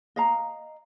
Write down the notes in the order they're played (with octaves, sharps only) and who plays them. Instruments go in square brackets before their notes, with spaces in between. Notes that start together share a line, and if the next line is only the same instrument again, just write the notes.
[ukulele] D#5 F5 A#5